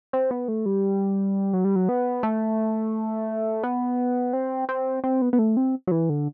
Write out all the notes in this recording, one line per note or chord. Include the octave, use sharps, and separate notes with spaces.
C4
B3
A3
G3
F#3
G3
F#3
B3
A3
B3
C4
C4
C4
B3
B3
A3
C4
F#3
E3
D3